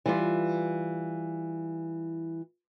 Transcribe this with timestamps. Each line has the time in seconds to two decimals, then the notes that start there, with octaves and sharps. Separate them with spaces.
0.06 E3 G3 F4